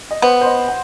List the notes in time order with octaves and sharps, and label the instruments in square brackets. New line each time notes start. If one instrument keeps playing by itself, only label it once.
[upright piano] D#5
[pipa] B3 [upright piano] C5
[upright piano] C5
D#5
F#5